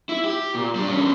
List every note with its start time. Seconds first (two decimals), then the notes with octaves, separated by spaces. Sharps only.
0.09 E4
0.24 G4
0.55 A#2
0.75 G3 D4
0.89 E2 C#4